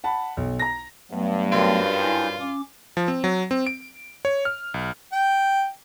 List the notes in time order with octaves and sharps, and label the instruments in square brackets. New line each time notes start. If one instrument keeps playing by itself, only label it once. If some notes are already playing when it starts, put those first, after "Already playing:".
[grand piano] F#5 A5 B5
B1
A#5 A#6
[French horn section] G2 [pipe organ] F#3 A3 B3
[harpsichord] F#2 C4 [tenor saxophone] F4
[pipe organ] E4 G#5 G6
C#4 D6
[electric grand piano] F3
C4
F#3
C4
D7
C#5
F6
B1
[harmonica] G5